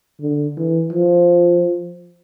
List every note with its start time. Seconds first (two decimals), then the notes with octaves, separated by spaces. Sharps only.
0.21 D3
0.57 E3
0.92 F3